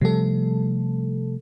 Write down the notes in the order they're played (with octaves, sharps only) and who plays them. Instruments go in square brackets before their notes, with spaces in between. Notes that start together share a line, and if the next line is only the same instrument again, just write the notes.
[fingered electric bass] C3 F3 A3 [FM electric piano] G3 A4